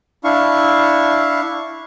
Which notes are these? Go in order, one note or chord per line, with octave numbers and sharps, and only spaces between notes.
D4 E4 F5 C#6